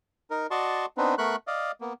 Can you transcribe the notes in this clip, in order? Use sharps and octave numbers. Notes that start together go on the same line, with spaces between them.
D#4 A#4
F#4 D5 D#5 A5 C6 C#6
B3 C4 D4 D#4 B4
A3 B3 A#4 B5 C#6 F#6
D5 D#5 F5
A#3 B3